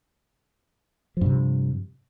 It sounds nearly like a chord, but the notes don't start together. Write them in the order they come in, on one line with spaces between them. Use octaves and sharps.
F3 G2 C3